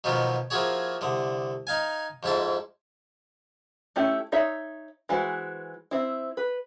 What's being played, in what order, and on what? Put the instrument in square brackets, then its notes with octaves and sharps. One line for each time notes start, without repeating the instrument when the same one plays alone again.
[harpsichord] B2 D#3 F3 F#3 B3
F3 A#3 E4 F#4 G#4 C#5
C2 D3 D#6
D#4 F5 G#5
F2 G#2 E4 A5
[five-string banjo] A3 C#4 E4 G4
D#4 C#5 E5
E3 G#3 F#4 C5
C4 E4
B4